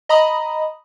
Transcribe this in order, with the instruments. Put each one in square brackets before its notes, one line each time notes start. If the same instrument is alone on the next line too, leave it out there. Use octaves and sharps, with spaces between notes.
[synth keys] D#5 A#5 B5 D#6